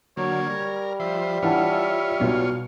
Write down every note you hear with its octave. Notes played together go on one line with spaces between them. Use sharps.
D3 F#3 A#3 C#5
G3 A#4
F3 C5 E5
E3 F4 C#5 F#5 A5
B1 F#3